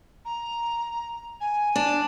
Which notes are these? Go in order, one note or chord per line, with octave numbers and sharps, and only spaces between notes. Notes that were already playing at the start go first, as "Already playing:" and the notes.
A#5
G#5
D4